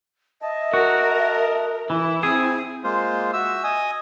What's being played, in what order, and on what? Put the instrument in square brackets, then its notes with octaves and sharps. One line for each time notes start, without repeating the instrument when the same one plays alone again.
[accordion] D#5 A5 [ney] E5
[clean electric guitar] F#4 [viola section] A#4
[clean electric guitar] E3 [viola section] E4 [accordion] E6
[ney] C4 [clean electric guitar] G#4
[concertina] G#3 A#3 F4 C5
F#4 E5 E6
D#5 G#5 D#6